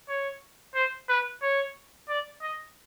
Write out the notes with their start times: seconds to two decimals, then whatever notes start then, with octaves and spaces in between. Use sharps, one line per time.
0.08 C#5
0.75 C5
1.09 B4
1.42 C#5
2.09 D5
2.42 D#5